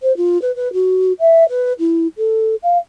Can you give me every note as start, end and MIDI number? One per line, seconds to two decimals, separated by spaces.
0.02 0.15 72
0.17 0.40 65
0.42 0.54 71
0.56 0.72 71
0.73 1.13 66
1.20 1.48 76
1.49 1.73 71
1.79 2.07 64
2.17 2.55 69
2.63 2.78 77